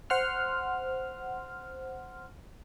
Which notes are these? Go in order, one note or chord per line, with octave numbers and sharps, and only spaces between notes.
C5 F#5 C6 F6